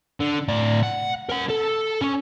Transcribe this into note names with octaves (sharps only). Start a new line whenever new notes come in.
D3
A2 D5
F#5
A#4 F#5
A4
C#4 C#5